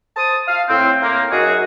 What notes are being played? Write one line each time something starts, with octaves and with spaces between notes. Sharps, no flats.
C5 A5 D#6
F5
A2 C4
A#3
F#2 D#4 F#4 G#4